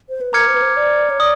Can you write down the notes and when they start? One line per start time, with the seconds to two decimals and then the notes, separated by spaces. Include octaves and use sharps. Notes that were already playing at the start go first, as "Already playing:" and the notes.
0.09 C5
0.21 B4
0.33 A#4 A#5 D6 F6 G#6 C#7
0.47 C5
0.55 B4
0.62 C5
0.77 D5
1.10 C#5
1.20 D5 D#6